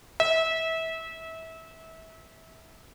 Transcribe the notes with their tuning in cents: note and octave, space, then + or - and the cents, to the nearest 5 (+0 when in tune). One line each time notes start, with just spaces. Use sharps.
E5 -25